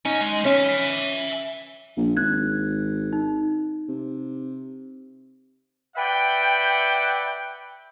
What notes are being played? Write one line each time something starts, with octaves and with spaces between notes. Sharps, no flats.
C#4 D#4
G#3
C#4 E5 G#5
A#1
G#1 F#6 G#6
D#4
C3
B4 D5 E5 F#5 G5